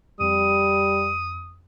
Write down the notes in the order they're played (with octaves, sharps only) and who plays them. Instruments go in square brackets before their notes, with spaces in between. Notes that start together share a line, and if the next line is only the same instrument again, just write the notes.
[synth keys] F2 [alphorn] G3 [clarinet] D#6